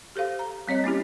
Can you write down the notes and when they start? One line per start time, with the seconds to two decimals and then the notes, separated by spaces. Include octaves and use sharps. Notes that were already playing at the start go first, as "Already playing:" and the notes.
0.16 G4 A4 C5 F5
0.39 A#5
0.68 G3 C4 C#5 D#5
0.84 A#3 C#4 E4 G4